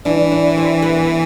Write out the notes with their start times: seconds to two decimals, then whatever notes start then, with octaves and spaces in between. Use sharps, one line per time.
0.05 E3 D4
0.32 D4
0.57 C4
0.82 B3